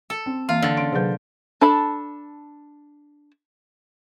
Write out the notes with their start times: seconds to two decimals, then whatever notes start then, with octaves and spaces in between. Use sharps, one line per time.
0.10 A4
0.26 C4
0.49 E3 A#3 F4
0.62 D3 E6 A6
0.77 C#3 C6 D7
0.92 C3 F#3 G#4 B4 G6
1.61 D4 A4 A5 B5